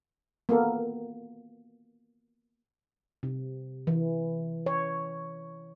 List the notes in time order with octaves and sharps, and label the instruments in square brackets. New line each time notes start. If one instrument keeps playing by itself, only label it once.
[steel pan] A#3 B3 A4
[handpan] C3
E3
C#5